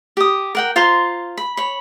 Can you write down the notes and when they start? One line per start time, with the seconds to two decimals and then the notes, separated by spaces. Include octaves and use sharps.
0.17 G4 D#6
0.55 A#4 F#5 G5
0.76 F4 C5 A#5 C6
1.37 B5
1.57 C#5 B5